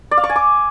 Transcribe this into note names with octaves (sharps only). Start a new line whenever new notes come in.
D5
F5
C#6
G#5
D6